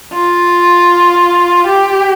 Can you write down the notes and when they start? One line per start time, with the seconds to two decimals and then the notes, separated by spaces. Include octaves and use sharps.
0.13 F4
1.67 G4